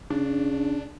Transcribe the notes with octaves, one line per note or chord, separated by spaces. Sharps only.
C#3 D4